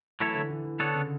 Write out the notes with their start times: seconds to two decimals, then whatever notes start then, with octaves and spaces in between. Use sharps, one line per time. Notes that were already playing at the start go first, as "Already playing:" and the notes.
0.20 E3 F#3 A3 E4 A4 C#5
0.35 D3
0.51 E3
0.65 E3
0.80 D3 B3 D4 A4 C#5
0.94 C#3